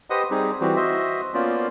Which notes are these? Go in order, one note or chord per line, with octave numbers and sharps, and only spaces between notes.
G4 B4 C5 D#5 F#5 D#6
G3 C4 D#4 G4 G#4
E3 G3 C4 F#4 G4
F#4 C5 D#5 E5
A#3 B3 C#4 F4 C5 D5